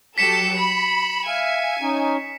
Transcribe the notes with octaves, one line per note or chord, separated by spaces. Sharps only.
F#3 G4 A4 B6 C#7 E7
B5
E5 F5 G#5
C#4 D#4